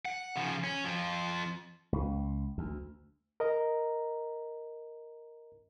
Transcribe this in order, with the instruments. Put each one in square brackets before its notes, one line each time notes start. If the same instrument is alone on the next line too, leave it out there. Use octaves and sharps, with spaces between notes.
[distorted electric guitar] F#5
C#3 F3
C#4
F2 F3
[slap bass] C#2
D2
[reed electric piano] A#4 D#5 A#5